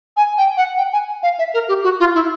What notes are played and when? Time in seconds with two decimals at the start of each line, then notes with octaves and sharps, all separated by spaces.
0.17 G#5
0.38 G5
0.57 F#5
0.78 G5
0.93 G#5
1.23 F5
1.39 E5
1.54 A#4
1.68 G4
1.84 F#4
2.00 F4
2.15 E4